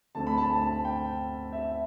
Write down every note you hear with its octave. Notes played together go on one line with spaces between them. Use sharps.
D2 D3 A3 C4 A5
B5
A5
A5
A5
G5
E5